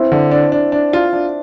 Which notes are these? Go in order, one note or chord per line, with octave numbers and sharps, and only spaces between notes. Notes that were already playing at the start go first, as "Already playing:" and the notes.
Already playing: C4 E4
D3
D4
D4
D4
F4
D4